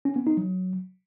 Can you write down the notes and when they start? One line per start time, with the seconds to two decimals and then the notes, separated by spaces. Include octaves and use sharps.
0.05 C#4
0.16 B3
0.27 D#4
0.37 F#3